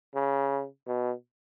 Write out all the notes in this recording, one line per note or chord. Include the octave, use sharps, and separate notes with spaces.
C#3
B2